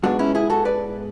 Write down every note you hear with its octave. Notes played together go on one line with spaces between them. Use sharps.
G#2 G#3 B3 D4 F#4
C#4 E4
E4 G#4
F#4 A4
B4 D5